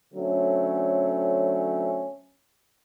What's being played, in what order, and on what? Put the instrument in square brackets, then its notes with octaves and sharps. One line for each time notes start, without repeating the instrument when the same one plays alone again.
[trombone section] D3 F#3 A3 C4 C#4